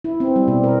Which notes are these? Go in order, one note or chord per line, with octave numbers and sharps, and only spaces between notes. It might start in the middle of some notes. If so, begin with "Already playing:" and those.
E4
C4
G3
B2
A#4